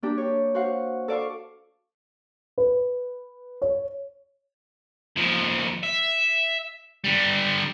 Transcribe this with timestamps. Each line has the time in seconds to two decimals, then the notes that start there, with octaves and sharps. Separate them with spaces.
0.02 A#3 D4 G4
0.18 G4 C#5
0.55 F#4 C5 F5 F#5
1.08 A4 D5 F5 C#6
2.58 B4
3.62 C#5
5.16 D#2 F3
5.83 E5
7.04 D3 G3